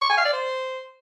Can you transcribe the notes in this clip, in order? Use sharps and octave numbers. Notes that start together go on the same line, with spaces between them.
C#6
G#5
F5
D5
C5